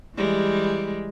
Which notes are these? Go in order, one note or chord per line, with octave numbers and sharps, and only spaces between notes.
E3 G3 G#3